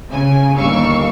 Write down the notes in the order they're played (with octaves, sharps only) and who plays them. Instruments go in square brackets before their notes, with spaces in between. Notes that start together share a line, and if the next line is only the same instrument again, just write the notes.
[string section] C#3 G#5
G1 D#2 G3 F5 C#6 E6